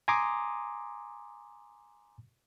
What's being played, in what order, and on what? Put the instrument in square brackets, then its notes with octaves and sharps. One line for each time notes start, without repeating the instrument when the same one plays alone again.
[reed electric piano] G#5 A#5 C6 D6 D#6